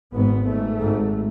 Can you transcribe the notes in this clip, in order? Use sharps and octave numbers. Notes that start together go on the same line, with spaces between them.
G#1 G#2 B3
G#1 G#2 A3
G#1 G#2